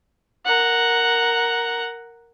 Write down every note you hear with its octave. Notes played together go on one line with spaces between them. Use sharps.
A#4 F#5